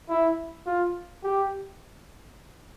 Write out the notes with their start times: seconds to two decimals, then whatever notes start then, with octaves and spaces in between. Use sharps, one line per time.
0.09 E4
0.66 F4
1.24 G4